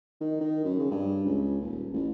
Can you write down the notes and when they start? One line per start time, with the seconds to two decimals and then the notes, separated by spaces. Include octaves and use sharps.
0.21 D#3
0.41 D#3
0.65 F#2
0.79 C#3
0.91 G2
1.25 C#2
1.62 D#1
1.93 A1